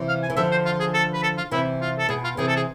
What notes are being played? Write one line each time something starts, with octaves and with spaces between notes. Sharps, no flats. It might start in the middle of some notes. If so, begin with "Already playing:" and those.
Already playing: C3 E3
F5
G#5
E3
D3 F3 E5
C5
F4
G#4
A4
B4
A4
F4
C3 E3 E4
F4
A4
B2 G#4
F4
C3 E3 G#4
A4
G#4